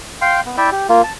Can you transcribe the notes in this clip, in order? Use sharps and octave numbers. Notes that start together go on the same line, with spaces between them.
F5 G5 C6
B3
E4 D5 E5 G5
G4
A#3 F4
A5